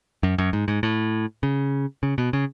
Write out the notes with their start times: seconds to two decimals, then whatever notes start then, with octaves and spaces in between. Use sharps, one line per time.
0.23 F#2
0.38 F#2
0.53 G#2
0.68 G#2
0.83 A2
1.43 C#3
2.03 C#3
2.18 B2
2.33 C#3